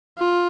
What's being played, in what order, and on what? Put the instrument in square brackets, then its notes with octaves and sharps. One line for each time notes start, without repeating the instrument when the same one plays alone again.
[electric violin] F4